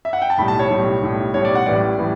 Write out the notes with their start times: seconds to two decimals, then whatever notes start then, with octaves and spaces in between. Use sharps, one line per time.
0.05 E5
0.13 F#5
0.22 G5
0.30 A5
0.38 B1 A2 G3 B5
0.48 A5
0.59 C#5
0.70 B1 A2 G3
1.02 B1 A2 G3
1.34 B1 A2 G3 C#5
1.45 D5
1.55 F#5
1.66 A1 A2 E3 G3 D5
1.98 A2 E3 G3